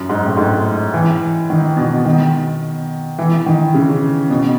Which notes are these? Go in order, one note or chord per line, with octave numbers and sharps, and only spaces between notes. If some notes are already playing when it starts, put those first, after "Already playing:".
Already playing: F#2
G#2
A2
G#2
E3
D#3
B2
D#3
E3
D#3
C#3
B2